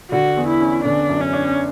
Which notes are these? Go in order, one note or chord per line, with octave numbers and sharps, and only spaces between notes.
D3 F#4
E2
E4
C#4
D3 D4
F#2
C#4
D4